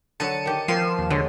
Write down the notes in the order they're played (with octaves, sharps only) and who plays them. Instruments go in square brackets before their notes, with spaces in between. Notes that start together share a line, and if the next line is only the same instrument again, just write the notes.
[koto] D3 F#3 [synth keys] A5 C#7 D#7
[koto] D#3 G4
[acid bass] F3 [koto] A#3 C4 [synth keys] C7 D#7 E7
[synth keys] D#2
[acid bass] D3 [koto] F#3 G#3